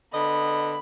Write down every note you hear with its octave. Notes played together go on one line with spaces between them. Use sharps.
D3 B3 D#5 B5